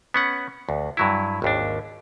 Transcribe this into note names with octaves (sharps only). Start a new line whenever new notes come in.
B3 C#4 F#5
D2
G2 F#3 E4
G#1 D#2 D4